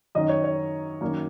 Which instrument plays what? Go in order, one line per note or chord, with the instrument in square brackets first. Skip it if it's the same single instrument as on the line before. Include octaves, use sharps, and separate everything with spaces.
[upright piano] F#2 D#3 F#3 D#5
C#5
C#5
F#2 D#3 A#3